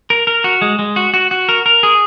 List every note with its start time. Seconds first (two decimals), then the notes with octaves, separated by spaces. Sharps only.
0.10 A#4
0.27 A#4
0.44 F#4
0.62 G#3
0.79 G#3
0.96 F#4
1.14 F#4
1.31 F#4
1.49 A#4
1.66 A#4
1.83 G#4